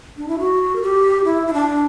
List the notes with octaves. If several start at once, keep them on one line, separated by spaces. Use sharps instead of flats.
D4
E4
F#4
A#4
G4
E4
E4
D4